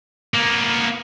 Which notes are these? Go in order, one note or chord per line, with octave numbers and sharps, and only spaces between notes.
A#3 B3